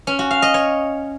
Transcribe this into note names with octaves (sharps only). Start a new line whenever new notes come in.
C#4
F#4
F5
D#5
C#5